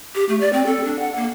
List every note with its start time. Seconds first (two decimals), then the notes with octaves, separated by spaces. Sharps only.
0.15 G4
0.29 A3
0.40 D5
0.53 C4
0.67 A4
0.84 D4
0.99 F#5
1.16 A#3